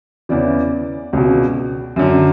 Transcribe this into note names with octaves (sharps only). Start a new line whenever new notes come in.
E2 C#3 E3 D5
C#2 B2
F#2 D3